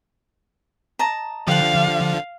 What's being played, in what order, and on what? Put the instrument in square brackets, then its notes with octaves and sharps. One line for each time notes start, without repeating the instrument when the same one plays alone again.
[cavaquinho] D#5 A5 A#5
[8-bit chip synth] D3 F3 [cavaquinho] G4 F#5 [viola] F5